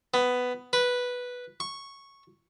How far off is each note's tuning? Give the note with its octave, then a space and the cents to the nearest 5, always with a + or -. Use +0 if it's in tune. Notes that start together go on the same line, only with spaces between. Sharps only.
B3 +10
B4 -5
C#6 -5